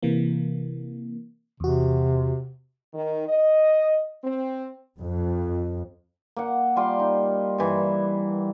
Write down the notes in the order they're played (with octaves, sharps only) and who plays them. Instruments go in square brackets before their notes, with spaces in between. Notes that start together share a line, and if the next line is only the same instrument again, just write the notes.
[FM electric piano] C3 E3 A#3
[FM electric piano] E2 F#4 [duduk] C3
[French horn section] D#3
D#5
C4
[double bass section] F2
[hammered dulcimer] A#3 F#5
G3 F4 C6 D6
D#4
G2 E3